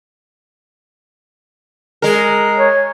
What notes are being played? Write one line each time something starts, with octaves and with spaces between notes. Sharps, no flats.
G#3 A#4
C#5